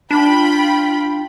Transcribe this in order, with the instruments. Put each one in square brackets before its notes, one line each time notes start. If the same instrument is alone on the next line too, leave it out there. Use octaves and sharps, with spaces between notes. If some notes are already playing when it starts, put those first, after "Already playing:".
[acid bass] D4 [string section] F4 G5 B5